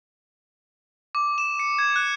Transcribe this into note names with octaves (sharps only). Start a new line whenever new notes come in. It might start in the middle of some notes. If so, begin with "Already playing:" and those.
D6
E7
C#7
G#6
F#6